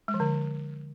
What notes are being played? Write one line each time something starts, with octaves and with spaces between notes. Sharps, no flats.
G#3
F3
D3